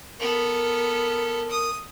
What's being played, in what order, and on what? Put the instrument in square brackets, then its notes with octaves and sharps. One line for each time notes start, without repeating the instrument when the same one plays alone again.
[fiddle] B3 A4 [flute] A#4
[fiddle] D#6